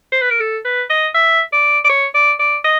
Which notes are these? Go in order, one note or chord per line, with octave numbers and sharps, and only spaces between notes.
C5
B4
A#4
A4
B4
D#5
E5
D5
D5
C#5
D5
D5
D#5